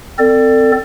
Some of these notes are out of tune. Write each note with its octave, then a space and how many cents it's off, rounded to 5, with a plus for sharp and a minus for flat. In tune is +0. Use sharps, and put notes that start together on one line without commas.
C4 -15 A4 +30 D5 +15